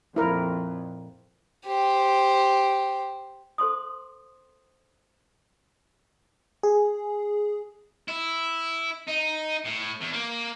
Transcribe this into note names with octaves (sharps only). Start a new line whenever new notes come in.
F2 A#2 E4 A#4
G4 C5
A4 C5 C6 D#6
G#4
E4
D#4
A2
E2
A#3